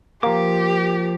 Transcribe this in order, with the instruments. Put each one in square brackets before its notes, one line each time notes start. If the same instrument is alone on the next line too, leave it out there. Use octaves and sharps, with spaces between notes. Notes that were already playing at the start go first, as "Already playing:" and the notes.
[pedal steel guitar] F3 D6 [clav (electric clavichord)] A#3 [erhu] G4